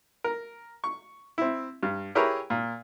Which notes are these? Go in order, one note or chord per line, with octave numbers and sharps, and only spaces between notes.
A#4
C#6
C4 E4
G2
E4 G4 G#4 A#4 B4 C#5
A#2